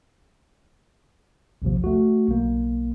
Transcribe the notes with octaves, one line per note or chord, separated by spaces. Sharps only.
A#1 D#2 C3 F3
A3 F#4
B1 A#3